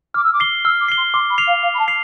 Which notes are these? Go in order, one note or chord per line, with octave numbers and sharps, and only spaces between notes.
D6 F6
E6
D6
C7 G7
E6 F6
D6
C7 G7
C6
C6 D6
B5
F6 C7 F7
F5
F5 D6
B5
A5
F6 C7 F7